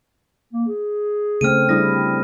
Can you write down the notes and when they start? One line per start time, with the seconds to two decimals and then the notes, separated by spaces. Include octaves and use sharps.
0.53 A#3
0.68 G#4
1.41 C#3 A3 C4 F6 D#7
1.69 G3 D4 E4 D#6 A#6
1.89 C4